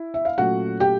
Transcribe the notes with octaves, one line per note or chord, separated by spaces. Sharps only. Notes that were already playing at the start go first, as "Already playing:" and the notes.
Already playing: E4
E5
F5
A#2 F#3 A3 C#4 F#4 F#5
G4 G5